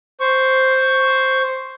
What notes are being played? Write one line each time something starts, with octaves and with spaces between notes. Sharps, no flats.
C5 C#6